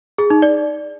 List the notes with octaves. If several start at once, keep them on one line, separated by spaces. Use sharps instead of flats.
G#4
D#4
D5